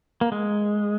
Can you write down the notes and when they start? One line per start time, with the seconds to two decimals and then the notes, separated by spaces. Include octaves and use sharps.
0.21 A#3
0.32 G#3